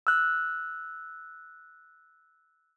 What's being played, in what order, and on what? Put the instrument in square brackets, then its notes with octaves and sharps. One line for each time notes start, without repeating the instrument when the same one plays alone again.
[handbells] E6 F#6